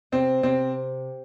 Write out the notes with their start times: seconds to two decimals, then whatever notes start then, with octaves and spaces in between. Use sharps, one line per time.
0.12 C3 C4
0.43 C3 C4